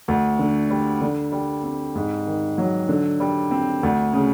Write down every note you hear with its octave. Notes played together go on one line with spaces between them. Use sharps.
D2
D3
G3
D3
G3
C4
G#2
D#3
F#3
D3
G3
C4
D2
C#3